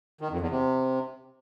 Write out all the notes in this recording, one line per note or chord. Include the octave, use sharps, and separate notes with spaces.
D#3
F2
E2
C3